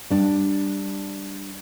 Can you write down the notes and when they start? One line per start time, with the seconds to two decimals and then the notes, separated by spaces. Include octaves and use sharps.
0.10 G3 D4